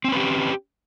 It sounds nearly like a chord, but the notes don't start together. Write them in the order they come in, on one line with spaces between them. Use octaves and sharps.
C4 C#4 B4 G4